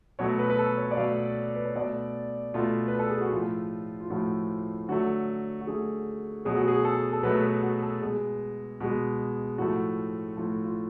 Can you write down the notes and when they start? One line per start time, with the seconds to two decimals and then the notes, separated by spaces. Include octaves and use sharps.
0.19 B2 F#3 A3 C#5
0.39 B4
0.50 B4
0.59 A4
0.77 C#5
0.91 D5
0.97 B2 F#3 A3 F5
1.56 B4
1.65 C#5
1.75 B2 A3 D5
2.54 B2 A3 F4
2.88 B4
2.99 A4
3.10 G#4
3.21 F#4
3.32 A2 F3 A3 F4
4.00 F4
4.10 A2 F3 A3 F#4
4.88 D3 F#3 A3 F#4
5.61 F#4
5.67 D3 F#3 A3 G#4
6.45 B2 F#3 A3 G#4
6.56 F#4
6.68 G#4
6.84 A4
7.13 A4
7.23 B2 F#3 A3 B4
7.43 B4
7.63 F#4
7.82 A4
8.01 B2 G#3 G#4
8.80 B2 G#3
9.58 A2 F3 A3 F#4
10.37 A2 F3 A3 F4
10.64 F4